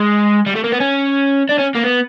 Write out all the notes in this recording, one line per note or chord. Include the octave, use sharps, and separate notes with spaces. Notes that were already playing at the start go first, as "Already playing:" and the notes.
Already playing: G#3
G3
A3
A#3
B3
C#4
D4
C#4
A#3
B3